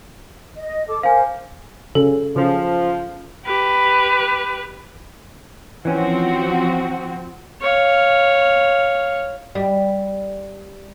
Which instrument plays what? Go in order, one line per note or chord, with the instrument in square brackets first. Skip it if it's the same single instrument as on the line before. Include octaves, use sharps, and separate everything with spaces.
[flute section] D#5
A4 D6
[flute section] A#4 C5 [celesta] F5 G#5
[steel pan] C#3 [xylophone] A4
[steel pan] C#3 [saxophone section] F3
[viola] G4 B4
[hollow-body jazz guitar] E3 C#4 [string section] F3 C4 F#4
[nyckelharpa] C#5 F5
[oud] G3